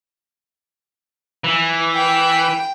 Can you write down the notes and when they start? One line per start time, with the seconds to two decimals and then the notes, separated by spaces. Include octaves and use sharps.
1.44 E3
1.95 G5